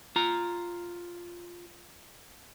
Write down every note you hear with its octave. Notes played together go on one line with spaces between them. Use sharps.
F4 A#5